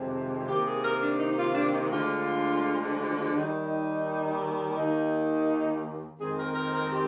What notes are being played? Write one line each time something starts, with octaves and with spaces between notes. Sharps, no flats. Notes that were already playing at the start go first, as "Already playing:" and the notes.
Already playing: F2 C3 D#3 G#3 C4
C3 D#3 A#3 G4
G#4
A#4
D4
D#4
F4
D4
D#4
D2 D3 F3 G#3 F4
D#2 D#3 G3 D#4
D#2 D#3 A#3 D#4
F2 D#3 G#3 C4 G#4
A#4
A#4
A#4
G4